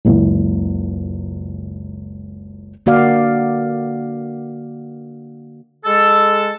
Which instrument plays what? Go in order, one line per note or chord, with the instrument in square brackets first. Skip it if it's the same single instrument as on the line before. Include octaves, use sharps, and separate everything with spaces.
[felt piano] F#1 C#2 E4
[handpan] D3 A#3 F#4 D5 F5
[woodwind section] G#3 A4